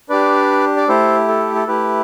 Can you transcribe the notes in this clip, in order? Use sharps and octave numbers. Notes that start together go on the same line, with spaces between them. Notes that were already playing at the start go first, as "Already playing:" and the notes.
D4 G4 B4 D5
D5
A3 E4 G4 A4 C5
A4
A4
A3 E4 G4 B4